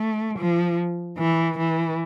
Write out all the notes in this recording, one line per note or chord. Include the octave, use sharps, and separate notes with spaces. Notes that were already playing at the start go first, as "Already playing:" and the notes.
Already playing: A3
F3
E3
E3